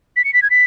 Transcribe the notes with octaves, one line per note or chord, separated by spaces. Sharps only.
B6
C#7
B6
G#6
B6